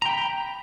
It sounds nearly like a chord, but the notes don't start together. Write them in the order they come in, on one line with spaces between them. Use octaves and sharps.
A#5 G5 B5